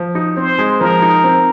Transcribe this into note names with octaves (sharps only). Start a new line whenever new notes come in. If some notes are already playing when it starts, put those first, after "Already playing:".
Already playing: F3
D#4
C4 C5
G#3
F3 A#4
D#4
C4